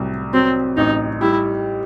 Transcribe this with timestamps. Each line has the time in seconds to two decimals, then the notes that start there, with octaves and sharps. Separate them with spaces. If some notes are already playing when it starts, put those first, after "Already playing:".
Already playing: C2 A2 F#3
0.34 F#3 C4
0.77 A1 D#4
1.21 G3 E4